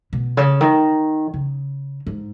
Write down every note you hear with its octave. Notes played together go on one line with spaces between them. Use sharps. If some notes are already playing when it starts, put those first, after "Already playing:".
B2
C#3
D#3
C#3
G#2